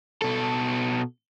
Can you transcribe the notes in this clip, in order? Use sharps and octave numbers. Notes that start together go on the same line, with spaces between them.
B2 A4